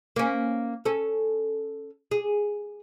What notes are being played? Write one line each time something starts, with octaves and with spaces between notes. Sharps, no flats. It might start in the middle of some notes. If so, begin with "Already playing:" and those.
A#3 C#4
C#4 A4
G#4